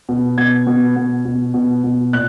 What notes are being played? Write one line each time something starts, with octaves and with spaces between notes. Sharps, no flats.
B2
B2 G#6
B2
B2
B2
B2
B2
A#2 F#6